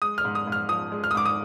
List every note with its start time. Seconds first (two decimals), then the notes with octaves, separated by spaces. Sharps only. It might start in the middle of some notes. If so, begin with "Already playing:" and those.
0.02 G#3 D#6
0.18 F6
0.25 G#2
0.35 D#6
0.47 G#2
0.52 F6
0.69 F3 D#6
0.92 G#3
1.04 F6
1.11 D#6
1.15 G#2 D6
1.25 D#6